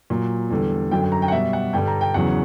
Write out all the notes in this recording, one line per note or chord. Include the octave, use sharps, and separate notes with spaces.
A#2 F#3
E2 D3 G3
F#2 D3 F#3 G5
G5
A#5
G5
F#5
B2 G3 E5
F#5
G2 D3 G3 G5
A#5
G5
E2 C#3 F#3 F#5